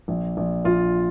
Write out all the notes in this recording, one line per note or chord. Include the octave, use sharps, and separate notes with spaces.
A#1
A#1
A#1 F4